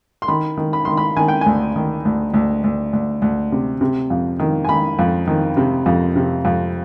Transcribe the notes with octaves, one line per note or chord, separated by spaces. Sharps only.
C6
D#3 B5
D#3
B5
D#3 C6
B5
D#3 G#5
G5
D2 G#5
D#3
D2
D2
D2
D2
D2
C3
C3
F2
D#3
G#5
D#3 B5
F2
D#3
C3
F2
C3
F2